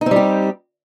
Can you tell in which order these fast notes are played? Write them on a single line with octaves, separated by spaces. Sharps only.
D#4 C4 G3 G4